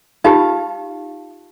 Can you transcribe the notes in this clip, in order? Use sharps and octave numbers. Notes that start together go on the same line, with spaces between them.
D#4 F4 G4 F5 A5